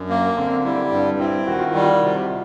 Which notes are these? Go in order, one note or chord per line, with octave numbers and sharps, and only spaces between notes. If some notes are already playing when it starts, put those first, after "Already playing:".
Already playing: F#2 D4
A#3
D3 C4
G3 E4
G2
C4 E4
D#3 F#4
F4
G3 E4
F4
C3